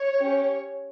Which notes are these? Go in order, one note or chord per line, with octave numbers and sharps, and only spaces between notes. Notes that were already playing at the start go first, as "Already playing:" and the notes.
Already playing: C#5
C#4 G4